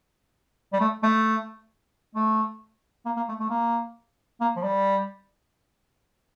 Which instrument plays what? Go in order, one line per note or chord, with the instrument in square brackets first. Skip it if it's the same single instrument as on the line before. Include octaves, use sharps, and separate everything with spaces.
[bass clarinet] G3
A3
A3
A3
A#3
A#3
A3
A3
A#3
A#3
F3
G3